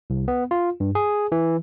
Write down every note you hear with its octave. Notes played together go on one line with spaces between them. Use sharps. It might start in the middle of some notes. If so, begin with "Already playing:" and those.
C2
B3
F4
G2
G#4
E3